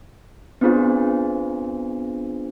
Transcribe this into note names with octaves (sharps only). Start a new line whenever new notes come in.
B3 C4 D4 F4 G#4 C5